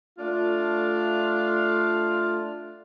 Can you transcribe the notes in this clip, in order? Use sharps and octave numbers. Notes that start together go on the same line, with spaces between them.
A3 D4 F4